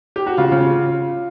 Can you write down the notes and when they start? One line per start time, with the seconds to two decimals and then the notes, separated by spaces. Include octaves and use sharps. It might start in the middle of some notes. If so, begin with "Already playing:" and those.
0.16 G4
0.26 F#4
0.37 C#3 F4
0.52 C#3